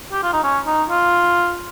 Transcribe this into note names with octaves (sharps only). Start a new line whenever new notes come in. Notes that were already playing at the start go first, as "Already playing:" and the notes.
G4
F4
D#4
C#4
D#4
F4